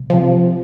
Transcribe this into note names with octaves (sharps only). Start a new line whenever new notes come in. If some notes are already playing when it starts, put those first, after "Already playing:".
Already playing: C2
C3 F3